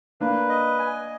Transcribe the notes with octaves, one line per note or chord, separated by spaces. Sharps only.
A#3 D4 B4
D#5
G#5